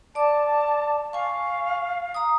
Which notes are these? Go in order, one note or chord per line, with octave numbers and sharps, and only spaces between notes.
D5 A5 D6
F5 G#5 C#6
A#5 D#6